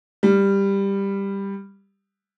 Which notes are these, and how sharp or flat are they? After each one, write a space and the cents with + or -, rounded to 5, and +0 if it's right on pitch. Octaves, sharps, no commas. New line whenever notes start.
G3 +10